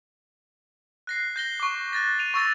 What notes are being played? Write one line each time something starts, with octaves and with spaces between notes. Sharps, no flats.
F#6 A#6 C7
G6 A#6 G7
C#6 D6
F#6 A6 A#6
D#7 F7
C#6 E6 A6 A#6